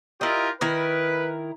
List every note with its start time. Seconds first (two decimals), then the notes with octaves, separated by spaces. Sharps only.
0.21 E4 F4 G4 A#4 D#5
0.61 D#3 E4 A#4 B4